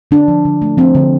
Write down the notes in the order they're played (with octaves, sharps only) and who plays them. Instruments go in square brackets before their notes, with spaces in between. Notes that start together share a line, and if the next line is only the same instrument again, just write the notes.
[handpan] D3 D4
F3
D3
A3
F3 C4
D3